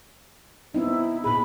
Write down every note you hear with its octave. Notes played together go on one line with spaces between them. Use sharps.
B3 C4 D#4 E4
A#2 G#4 B5